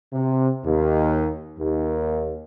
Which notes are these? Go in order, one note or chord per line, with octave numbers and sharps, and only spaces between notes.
C3
D#2
D#2